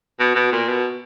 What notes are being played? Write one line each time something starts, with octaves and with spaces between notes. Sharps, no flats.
B2
B2
A#2
B2